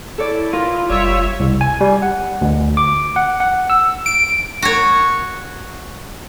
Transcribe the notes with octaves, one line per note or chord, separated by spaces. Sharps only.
E4 A4 C#5 D5
F4 A#4 B4
F#1 G3 C#5 D5 E5
C2
G#5
G3
F#5
D2
D6
F#5
F#5
E6
D7
F#4 C#5